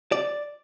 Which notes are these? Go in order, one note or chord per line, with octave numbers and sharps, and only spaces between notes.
D5